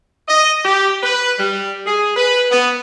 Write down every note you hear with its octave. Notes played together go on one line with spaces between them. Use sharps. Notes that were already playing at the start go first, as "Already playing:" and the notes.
D#5
G4
B4
G3
G#4
B4
B3